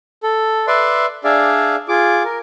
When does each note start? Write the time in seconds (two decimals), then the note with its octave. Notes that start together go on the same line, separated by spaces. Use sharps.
0.23 A4
0.68 B4 D5 E5 C6
1.24 D4 G#4 D5 E5 F5
1.88 F4 G#4 D6
2.25 A#4